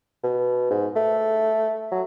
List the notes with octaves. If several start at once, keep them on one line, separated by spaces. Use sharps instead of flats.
B2
G#2
A3
F#3